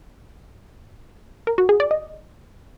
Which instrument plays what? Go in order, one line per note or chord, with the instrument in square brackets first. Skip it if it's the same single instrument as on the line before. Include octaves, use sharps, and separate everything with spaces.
[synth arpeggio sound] A#4
F#4
G#4
D5
D#5